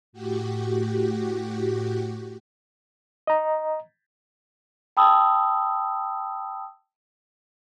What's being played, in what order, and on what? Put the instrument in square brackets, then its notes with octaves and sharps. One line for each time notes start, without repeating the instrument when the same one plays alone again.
[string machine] A2 F#4 G4
[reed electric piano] D#5 A#5
[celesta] G5 A5 B5 D#6 E6